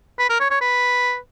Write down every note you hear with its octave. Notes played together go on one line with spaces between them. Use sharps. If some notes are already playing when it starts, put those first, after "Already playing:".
B4
A#4
C#5
C#5
B4